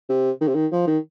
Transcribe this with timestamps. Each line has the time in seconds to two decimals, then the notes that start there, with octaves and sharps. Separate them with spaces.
0.09 C3
0.41 D#3
0.48 C3
0.55 D#3
0.72 F3
0.87 D#3